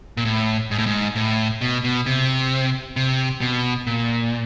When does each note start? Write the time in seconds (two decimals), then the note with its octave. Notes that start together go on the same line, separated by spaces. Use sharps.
0.17 A#2
0.25 A2
0.71 G#2
0.78 A2
0.86 G#2
1.16 A2
1.61 B2
1.84 B2
2.06 C3
2.96 C3
3.41 B2
3.87 A#2